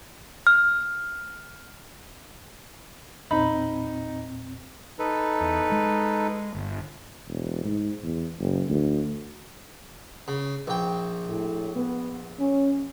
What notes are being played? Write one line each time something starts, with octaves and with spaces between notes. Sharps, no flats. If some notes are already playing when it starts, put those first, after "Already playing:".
F6
E2 A#2 C4 D#4 B5
D#4 A4 B4
E2
G#3
G1
E1
G#2
E2
F#1
D2
C#3
A#1 G5
A2
B3
C#4